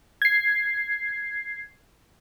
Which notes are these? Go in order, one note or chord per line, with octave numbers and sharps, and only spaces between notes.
G#6 C7